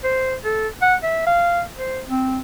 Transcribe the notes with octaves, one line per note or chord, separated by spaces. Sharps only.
C5
A4
F#5
E5
F5
C5
C4